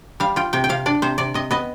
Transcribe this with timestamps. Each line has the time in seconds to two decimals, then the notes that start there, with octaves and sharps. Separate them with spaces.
0.20 G3 F5
0.36 F4 G5
0.53 C3 G5
0.64 G5
0.69 C3 F5
0.86 D4 D5
1.02 C3 C5
1.18 C3 D5
1.34 C3 D#5
1.51 B3 D#5